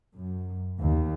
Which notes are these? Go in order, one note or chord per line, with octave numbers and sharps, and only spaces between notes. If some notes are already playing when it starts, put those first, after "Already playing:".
F#2
D#2